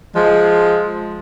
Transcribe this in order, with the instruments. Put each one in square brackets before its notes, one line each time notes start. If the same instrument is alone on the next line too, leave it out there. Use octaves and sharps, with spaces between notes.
[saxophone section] F3 G#3